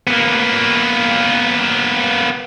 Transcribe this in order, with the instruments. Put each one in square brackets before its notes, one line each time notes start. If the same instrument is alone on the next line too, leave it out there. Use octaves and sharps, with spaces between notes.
[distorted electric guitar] A#3 B3